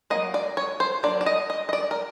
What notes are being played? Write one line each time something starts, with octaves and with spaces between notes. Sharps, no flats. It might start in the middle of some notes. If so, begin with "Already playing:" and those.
F#3 A#3 D#5
D5
C#5
C5
F#3 A#3 D4 D5
D5
D#5
D#5
D#5
D5
A#4